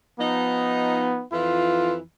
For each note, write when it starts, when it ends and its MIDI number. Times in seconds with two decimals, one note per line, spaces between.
0.19 1.22 53
0.19 1.25 59
0.19 1.22 63
1.32 2.00 41
1.32 2.00 52
1.32 1.96 65